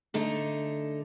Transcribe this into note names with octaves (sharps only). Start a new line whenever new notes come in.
D3 A3 D#4